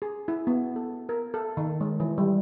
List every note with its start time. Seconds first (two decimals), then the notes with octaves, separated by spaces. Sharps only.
0.02 G#4
0.28 E4
0.47 B3
0.76 A4
1.09 A#4
1.34 A4
1.57 D#3
1.81 G#3
2.00 E3
2.18 G3